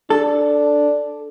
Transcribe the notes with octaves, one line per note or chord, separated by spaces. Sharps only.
D4 A4